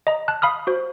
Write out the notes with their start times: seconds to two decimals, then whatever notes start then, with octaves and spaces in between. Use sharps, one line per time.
0.07 D#5 A#5
0.28 A5 F#6
0.42 F5 B5 D#6 F6
0.67 F#4 C5